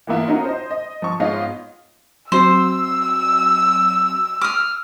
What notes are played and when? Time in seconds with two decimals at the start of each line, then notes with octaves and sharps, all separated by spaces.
0.07 E3 A#3 B3 E4 F4
0.28 C#4 D#4 F4 F#4 A#4
0.44 C5 D#5
0.71 D#5
1.02 F3 C#6
1.20 G#2 B3 F4 C#5 D#5
2.32 F#3 C4 F#4 C5 E6
4.41 D6 D#6 F6